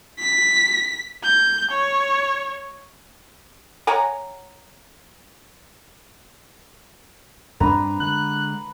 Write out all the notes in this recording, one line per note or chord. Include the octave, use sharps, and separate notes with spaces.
B6
G6
C#5
C#5 F#5 G#5 A#5
G2 C4 D4 B4 A#5
D3 G#3 F#6